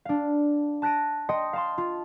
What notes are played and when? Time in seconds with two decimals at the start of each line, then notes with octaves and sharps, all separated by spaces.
0.05 D4 F5
0.82 A5 F#6 A#6 D7 D#7
1.29 D#5 G5 C6 D#6 C#7
1.53 F5 A5 C6
1.78 F4